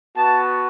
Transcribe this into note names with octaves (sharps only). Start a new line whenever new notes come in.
B3 F#4 A5